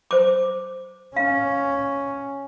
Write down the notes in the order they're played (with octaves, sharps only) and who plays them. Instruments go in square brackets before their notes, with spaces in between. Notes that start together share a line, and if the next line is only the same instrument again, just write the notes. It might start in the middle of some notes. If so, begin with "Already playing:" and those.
[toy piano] C5 D6
[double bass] C#4 [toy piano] F5